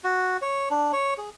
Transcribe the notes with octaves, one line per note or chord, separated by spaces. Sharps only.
F#4
C#5
D4
C#5
G#4